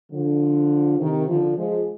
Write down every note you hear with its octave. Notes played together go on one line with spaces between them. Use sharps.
D3 F3
C3 D#3
D3 F3
F3 G#3